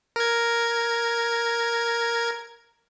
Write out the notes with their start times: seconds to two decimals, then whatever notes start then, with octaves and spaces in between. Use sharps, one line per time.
0.16 A#4 G#6